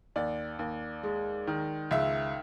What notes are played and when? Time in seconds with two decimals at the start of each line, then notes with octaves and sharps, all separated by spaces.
0.16 D#2 D5
0.59 D#2
1.03 G#3
1.47 D#3
1.91 C#2 E5